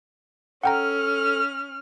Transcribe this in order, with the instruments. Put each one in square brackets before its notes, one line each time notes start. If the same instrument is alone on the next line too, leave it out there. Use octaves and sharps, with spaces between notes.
[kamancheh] C#4 F6 [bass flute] A4 [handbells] F#5 G5 A#5